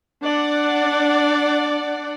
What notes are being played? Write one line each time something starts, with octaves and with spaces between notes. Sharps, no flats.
D4 D5 F#5